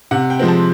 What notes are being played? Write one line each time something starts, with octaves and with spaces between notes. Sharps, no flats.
C3 F#5
G5
F3 G#3 C4
A5